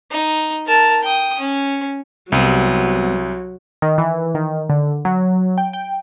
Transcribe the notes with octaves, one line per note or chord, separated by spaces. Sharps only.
D#4
A#4 A5
G5 D#6
C#4
C2 F#3 G3 B3 C4
D#3
E3
D#3
D3
F#3
G5
G5